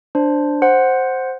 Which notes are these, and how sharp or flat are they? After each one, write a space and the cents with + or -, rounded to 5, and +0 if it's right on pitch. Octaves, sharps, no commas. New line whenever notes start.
D4 +0 C5 +0
C5 +5 F#5 +0